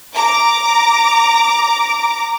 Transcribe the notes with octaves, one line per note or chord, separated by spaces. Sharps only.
A#5 D6